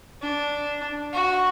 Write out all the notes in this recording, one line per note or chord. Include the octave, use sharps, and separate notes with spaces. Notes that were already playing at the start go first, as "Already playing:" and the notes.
D4
F#4